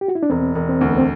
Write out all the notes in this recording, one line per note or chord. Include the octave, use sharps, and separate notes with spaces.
G4
F#4
E4
D4
E1 C4
E1
C4
D2
B3
C4